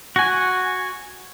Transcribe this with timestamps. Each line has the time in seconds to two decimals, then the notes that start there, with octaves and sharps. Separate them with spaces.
0.16 F#4 G#5